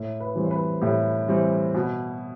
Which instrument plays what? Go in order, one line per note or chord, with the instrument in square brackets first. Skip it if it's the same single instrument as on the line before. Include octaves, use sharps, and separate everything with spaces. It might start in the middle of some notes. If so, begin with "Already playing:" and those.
Already playing: [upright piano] A2
B4
E3 G3 C4
C5
B4
A2 G4
E3 G3 C4
B2